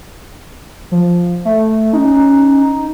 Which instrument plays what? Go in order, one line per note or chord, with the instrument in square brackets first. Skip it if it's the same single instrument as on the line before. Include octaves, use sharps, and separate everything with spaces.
[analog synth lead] F3
A3
[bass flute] C#4 [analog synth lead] D#4